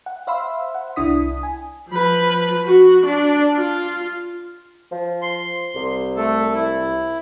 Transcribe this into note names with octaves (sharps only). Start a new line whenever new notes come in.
F#5
C5 E5 F5 B5 C6 E6
F#5
C2 D4 E4 D#6 B6
G#5
F3 B4
F#4
D4
F4
F3
C6
C2
A3 A4
E4